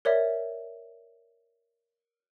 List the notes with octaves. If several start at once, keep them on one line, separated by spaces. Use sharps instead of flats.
A#4 C#5 D5 E5